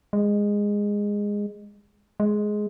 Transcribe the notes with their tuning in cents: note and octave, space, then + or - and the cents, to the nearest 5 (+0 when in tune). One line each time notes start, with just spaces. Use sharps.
G#3 -15
G#3 +10